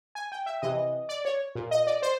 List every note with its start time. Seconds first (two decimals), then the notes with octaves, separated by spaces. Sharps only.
0.15 G#5
0.32 G5
0.46 E5
0.62 C3 E3 D#5
1.09 D5
1.25 C#5
1.55 A#2
1.71 D#5
1.87 D5
2.02 C5